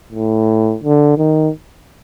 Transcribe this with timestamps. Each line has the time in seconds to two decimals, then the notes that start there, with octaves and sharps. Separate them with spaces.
0.12 A2
0.83 D3
1.17 D#3